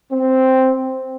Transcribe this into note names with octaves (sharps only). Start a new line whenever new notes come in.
C4